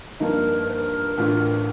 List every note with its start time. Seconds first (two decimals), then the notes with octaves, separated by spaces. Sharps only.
0.20 G2 F3 A#3 D#4 A#4
0.69 C5
0.73 A#4
1.17 A1 A2 A3 D4 F4